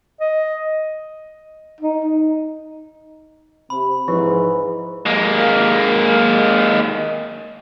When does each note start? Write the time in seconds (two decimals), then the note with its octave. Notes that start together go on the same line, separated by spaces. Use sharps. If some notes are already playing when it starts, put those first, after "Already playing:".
0.21 D#5
1.80 D#4
3.70 C3 B5
4.08 G#2 E3 F3
5.06 G#3 A#3